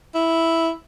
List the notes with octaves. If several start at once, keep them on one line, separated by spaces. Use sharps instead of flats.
E4